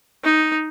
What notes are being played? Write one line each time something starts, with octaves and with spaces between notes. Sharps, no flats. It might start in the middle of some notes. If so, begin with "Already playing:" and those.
D#4